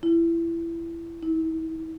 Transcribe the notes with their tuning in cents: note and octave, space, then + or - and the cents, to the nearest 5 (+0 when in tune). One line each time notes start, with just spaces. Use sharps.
E4 +20
E4 -40